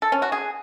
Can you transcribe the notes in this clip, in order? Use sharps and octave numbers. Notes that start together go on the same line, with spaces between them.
A4
C#4
F#4
G#4